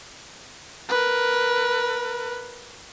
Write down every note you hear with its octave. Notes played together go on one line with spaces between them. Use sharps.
A#4 B4